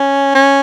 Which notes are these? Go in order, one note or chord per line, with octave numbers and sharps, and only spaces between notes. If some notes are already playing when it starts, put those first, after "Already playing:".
Already playing: C#4
C#4